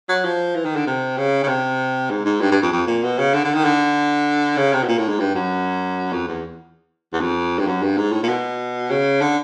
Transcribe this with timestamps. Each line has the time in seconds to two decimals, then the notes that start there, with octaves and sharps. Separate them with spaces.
0.09 F#3
0.25 F3
0.55 E3
0.65 D#3
0.76 D3
0.87 C3
1.18 C#3
1.43 C#3
1.48 C3
2.11 G#2
2.25 G#2
2.41 G2
2.52 G2
2.62 F2
2.72 F2
2.87 A#2
3.04 B2
3.18 C#3
3.34 D3
3.45 D3
3.54 D#3
3.65 D3
4.57 C#3
4.73 C3
4.84 B2
4.88 A#2
4.98 A2
5.09 G#2
5.20 G2
5.35 F#2
6.12 F2
6.28 E2
7.13 E2
7.21 F2
7.59 G2
7.67 F#2
7.83 G2
7.98 G#2
8.13 A2
8.23 A#2
8.29 B2
8.90 C#3
9.21 D3